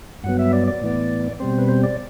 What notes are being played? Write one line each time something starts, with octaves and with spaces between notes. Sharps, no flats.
G2 F#3 B3 F#5
E5
D5
D5
A2 E3 B3
B2 G3 C4 C5
B4
C5
D5